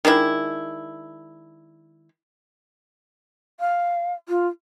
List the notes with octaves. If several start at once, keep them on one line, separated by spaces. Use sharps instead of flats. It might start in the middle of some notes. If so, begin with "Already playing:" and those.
D#3 G#3 D4 E4
F5
F4